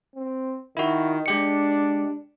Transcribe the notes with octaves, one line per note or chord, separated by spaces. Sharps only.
C4
D#3 E4 F#4
G#3 D4 G4 C#7